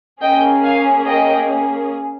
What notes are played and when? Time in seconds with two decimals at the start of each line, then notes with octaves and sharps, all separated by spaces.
0.21 A#3 C#4 G#4 D#5 G5
0.64 F5 G#5
1.07 D#5 G5